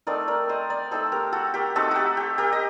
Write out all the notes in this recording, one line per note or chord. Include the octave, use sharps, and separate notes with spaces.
A3 C4 D#4 A#4 D5
A#4 D5
C5 D#5
A#4 D5
A3 C4 D#4 A4 C5
G4 A#4
F#4 A4
G4 A#4
A3 C4 D#4 F#4 A4
F#4 G4
G4
G4 A#4
D#5